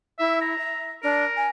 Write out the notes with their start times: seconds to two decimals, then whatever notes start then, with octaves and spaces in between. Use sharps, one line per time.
0.19 E4 E5
0.41 A#5
0.58 E5
1.03 D4 A#4
1.36 G#5